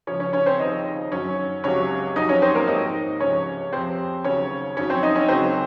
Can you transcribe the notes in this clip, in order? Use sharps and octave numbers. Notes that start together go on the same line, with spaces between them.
C#2 C#3 F3 C#4 C#5
C#4 C#5
C#4 C#5
C4 C5
D#2 C#3 F3 D#4 D#5
F#2 D#3 F#3 C#4 C#5
C#2 C3 F#3 C#4 C#5
F2 C3 D#3 F#3 D#4 D#5
C#4 C#5
C4 C5
A#3 A#4
G#2 F3 D#4 D#5
C#2 C3 F3 C#4 C#5
F2 C3 F3 C4 C5
D#2 C#3 F#3 C#4 C#5
F2 D#3 F#3 C#4 C#5
C4 C5
D#4 D#5
C#4 C#5
C#2 C#3 F#3 C4 C5